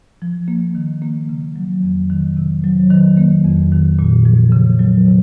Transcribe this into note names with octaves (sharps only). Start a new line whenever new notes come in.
F3
A#3
D#3
A#3
C#3
F#3
F2
D#3
C3
F#3
D#3
A#3
F2
D#3
A#2
F3
C#3
F#3
C3